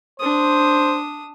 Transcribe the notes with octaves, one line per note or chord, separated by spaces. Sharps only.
D4 C5 D#6